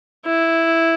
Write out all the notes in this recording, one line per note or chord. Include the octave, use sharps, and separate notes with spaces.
E4